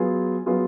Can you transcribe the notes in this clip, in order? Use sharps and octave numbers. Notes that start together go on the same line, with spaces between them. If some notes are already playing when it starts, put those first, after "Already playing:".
Already playing: F#3 B3 F4 G#4
F#3 B3 F4 G#4